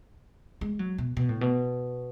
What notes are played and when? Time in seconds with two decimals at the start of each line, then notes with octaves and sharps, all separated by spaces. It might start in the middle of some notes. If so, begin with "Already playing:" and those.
0.61 G#3
0.79 F#3
0.98 B2
1.17 B2
1.29 A2
1.41 B2